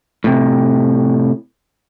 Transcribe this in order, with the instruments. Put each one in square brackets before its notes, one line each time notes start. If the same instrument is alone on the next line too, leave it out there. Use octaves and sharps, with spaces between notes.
[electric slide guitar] A2 C3